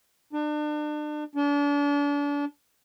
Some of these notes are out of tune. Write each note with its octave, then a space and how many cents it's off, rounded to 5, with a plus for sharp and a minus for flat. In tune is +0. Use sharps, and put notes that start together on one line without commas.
D4 +35
D4 -35